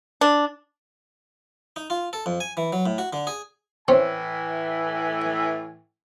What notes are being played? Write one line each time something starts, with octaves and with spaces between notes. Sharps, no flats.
D4
D#4
F4
A4
F2
G#5
E3
F#3
A2
F#4
D3
G#4
A2 E3 C4 C#4 G#5